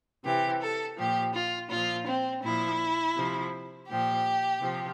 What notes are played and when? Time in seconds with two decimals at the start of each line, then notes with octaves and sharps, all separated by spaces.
0.24 C3 E3 G4
0.61 A4
0.96 A#2 F3 G4
1.33 F4
1.70 A#2 F3 F4
2.07 C4
2.42 A#2 F3 E4
3.16 C3 F3
3.89 A#2 F3 G4
4.61 C3 F3